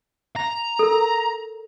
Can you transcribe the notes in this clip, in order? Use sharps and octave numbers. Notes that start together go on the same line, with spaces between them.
A#5
A4 A#4